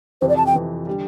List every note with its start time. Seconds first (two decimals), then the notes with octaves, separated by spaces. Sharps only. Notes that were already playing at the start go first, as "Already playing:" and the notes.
0.21 F2 C3 E3 C5
0.29 D5
0.37 A5
0.46 G5
0.54 F2 C3 E3
0.87 D3 G3